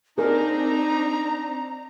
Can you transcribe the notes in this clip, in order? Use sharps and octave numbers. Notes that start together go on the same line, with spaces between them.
C4 D4 D#4 G#4 A#4 A#5